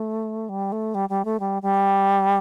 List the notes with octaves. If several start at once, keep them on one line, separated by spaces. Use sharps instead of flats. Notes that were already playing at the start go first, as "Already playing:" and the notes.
Already playing: A3
G3
A3
G3
G3
A3
G3
G3